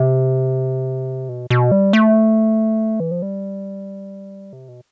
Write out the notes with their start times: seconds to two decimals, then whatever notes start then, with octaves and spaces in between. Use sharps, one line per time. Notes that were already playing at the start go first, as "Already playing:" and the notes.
Already playing: C3
1.29 B2
1.50 B2
1.71 G3
1.93 A3
3.00 E3
3.11 F3
3.22 G3
4.53 C3
4.68 B2